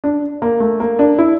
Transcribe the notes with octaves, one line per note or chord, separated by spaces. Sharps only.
D4
A#3
A3
A#3
D4
E4